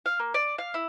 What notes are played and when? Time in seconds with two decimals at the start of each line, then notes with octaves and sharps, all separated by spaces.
0.06 F5
0.19 A#3
0.34 D5
0.58 F5
0.74 E4